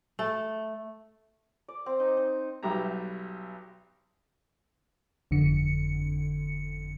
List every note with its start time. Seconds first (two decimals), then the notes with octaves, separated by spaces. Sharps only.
0.19 A3
1.68 D5
1.86 C4
2.00 D#4
2.17 D#4
2.63 B1 G3 F#4 G4 E5 A#5
5.31 G1 F2 D3 C#7